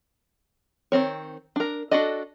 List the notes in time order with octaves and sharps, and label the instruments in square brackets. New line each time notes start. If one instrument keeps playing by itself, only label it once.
[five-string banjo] D#3 A3 C4 C#5
D4 A#4
D4 F#4 A4 D5 D#5